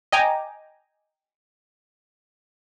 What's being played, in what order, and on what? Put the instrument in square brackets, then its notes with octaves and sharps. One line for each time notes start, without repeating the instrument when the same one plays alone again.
[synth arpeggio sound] D#5 G5 G#5 A#5 D6